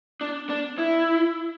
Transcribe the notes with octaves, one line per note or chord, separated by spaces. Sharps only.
D4
D4
E4